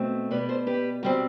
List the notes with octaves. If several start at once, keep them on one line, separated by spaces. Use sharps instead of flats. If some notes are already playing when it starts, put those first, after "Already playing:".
Already playing: B2 A3 C4
B2 G3 B3 B4 D5
A4 C5
G4 B4
B2 G3 C4